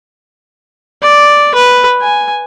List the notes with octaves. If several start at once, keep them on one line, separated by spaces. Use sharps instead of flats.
D5
B4
G#5